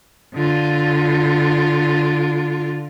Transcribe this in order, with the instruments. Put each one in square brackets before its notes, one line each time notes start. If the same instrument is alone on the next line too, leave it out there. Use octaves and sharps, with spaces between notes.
[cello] D3 F4